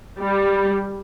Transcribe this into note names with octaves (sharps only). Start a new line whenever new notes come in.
G3